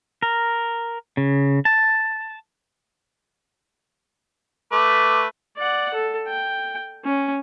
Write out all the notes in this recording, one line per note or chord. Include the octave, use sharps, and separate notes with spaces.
A#4
C#3
A5
A3 B4 D6
D5 F#5
A4
G5
C#4